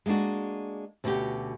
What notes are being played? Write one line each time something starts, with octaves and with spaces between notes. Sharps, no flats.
G#3 A#3 B3 D4 F#4
D2 B2 B3 C#4 F#4 G4